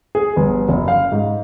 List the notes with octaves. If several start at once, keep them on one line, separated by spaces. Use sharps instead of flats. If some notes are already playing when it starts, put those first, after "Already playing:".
G#4
G1
F#1
F5
G#2